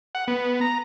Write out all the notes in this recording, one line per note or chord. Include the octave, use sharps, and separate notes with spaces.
F#5
B3
A#5